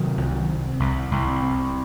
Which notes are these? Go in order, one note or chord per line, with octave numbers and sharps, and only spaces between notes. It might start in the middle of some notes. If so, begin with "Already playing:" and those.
Already playing: C3 D#3 F#3
C2
C3
C2
C2
C3